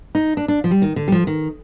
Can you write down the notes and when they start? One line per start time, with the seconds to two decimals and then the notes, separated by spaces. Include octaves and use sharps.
0.15 D#4
0.37 D4
0.48 D4
0.64 F3
0.71 G3
0.82 D#3
0.96 D3
1.08 G3
1.12 F3
1.27 D#3